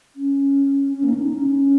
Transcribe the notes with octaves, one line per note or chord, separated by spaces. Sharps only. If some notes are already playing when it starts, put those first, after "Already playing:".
C#4
C#4
A#3
D#4
C#4
D#4
C#4